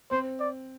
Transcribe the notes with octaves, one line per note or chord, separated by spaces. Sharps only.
C4 C5
D5